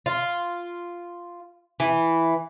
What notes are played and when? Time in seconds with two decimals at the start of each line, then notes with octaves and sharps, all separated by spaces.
0.06 F4
1.80 E3